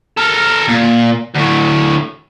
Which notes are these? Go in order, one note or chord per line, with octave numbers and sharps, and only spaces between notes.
A4 A#4
A#2
D2 A2